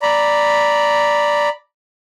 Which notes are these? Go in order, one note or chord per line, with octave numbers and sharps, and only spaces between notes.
D5 A#5 B5